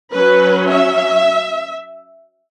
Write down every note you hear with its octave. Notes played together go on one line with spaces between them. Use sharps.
F#3 C#4 B4
E5